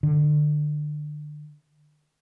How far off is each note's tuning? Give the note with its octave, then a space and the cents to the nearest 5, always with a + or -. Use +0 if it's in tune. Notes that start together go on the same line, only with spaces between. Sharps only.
D3 +30